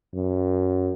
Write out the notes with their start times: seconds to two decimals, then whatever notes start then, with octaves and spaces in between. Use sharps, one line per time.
0.14 F#2